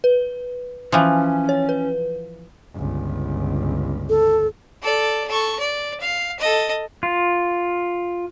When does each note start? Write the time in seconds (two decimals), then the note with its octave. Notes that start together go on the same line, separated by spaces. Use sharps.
0.04 B4
0.92 E3 F3 C#4
1.49 C#5
1.69 B4
2.74 G1 C#2
4.10 A4
4.83 A4 D5
5.28 A4 C#6
5.60 D5
6.01 F5
6.40 A4 D#5
7.03 F4